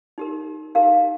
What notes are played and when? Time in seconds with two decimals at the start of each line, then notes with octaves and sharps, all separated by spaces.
0.18 D#4 G4 A#4
0.75 D#4 G4 A#4 F5